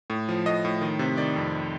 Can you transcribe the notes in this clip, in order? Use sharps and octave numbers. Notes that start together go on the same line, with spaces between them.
A2
F3
A2 D#5
A2
D#3
C3
D#3 D5
F2